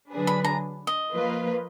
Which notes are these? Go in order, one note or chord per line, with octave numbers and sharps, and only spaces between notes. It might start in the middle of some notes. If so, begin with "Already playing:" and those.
D3 F#3 D4 G#4 B4
B5
A#5
D#5
F3 A#3 F4 B4